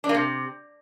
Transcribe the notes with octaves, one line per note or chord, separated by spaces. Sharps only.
D4
A#3
C3